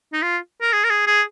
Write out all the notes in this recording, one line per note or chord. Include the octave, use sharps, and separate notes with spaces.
D#4
F4
A#4
G#4
A#4
G#4
G#4